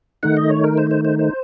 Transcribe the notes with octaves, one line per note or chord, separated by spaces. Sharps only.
D#3 A3 D#4 F#5
D#5
C#5
A#4
C5
C5
C5
C5